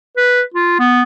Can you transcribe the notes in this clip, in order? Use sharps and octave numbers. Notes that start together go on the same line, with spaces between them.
B4
F4
B3